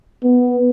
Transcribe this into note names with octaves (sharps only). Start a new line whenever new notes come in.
B3